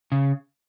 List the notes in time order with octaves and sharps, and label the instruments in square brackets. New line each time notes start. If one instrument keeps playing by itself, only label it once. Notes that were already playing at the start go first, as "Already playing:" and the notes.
[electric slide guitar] C#3